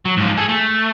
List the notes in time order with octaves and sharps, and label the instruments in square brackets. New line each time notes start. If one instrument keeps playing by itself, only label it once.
[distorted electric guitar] F#3
G#2 F3
G#4 A4
A3